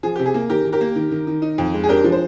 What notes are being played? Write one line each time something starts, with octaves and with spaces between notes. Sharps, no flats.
F3 G#4
C3 G4
G#4
A#3
D#3 G4 A#4
D#3
G4 A#4
A#3
D#3
D#3
D#3
D#4
F2
G#3
G#4
D4 G4 A#4
F3
C5